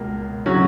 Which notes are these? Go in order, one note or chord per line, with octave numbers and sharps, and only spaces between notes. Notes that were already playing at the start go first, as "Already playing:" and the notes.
Already playing: C#2 B2 A#3
C#3 F#3 C#4 F#4